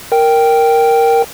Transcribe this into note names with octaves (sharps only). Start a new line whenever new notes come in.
A#4 G5